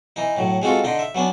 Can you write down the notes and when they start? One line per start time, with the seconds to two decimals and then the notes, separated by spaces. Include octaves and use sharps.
0.16 E3 D#4
0.37 A2 F#3
0.62 G#3 C4 F4 F#4 A4
0.84 D3 D#4 C6
0.99 E5
1.15 F#3 B3 C#4 D4